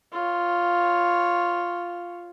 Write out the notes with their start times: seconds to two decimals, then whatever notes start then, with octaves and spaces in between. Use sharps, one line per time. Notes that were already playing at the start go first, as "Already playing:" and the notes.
0.12 F4 C#5